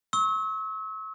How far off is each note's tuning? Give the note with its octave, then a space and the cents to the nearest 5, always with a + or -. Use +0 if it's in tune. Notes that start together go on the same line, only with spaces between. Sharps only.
C#6 -25 E6 -40